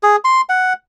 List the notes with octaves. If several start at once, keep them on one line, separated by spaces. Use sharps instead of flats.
G#4
C6
F#5